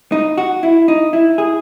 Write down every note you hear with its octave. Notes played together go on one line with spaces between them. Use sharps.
D#4
F#4
E4
D#4
E4
G#4